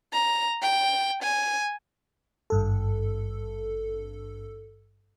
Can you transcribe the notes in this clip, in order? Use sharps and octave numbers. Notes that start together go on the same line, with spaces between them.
A#5
G5
G#5
G#1 G2 A4